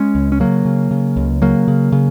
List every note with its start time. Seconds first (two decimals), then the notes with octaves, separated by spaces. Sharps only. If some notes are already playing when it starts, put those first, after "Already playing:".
Already playing: G#3 C#4
0.15 C#2
0.32 C#4
0.40 C#3 F#3 A#3
0.65 C#3
0.91 C#3
1.17 C#2
1.42 C#3 F#3 A#3
1.68 C#3
1.92 C#3